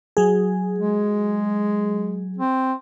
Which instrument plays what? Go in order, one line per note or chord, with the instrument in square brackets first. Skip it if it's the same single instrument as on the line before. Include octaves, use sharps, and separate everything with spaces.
[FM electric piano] F#3 G#4
[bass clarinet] G#3
C4